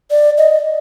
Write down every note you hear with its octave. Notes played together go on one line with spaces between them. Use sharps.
D5
D#5